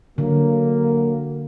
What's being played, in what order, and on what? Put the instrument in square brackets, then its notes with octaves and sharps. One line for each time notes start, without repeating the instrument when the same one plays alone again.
[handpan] D3 [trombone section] F#3 A#3